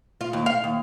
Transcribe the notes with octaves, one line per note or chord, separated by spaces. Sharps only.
F4
D#2
F5
D#2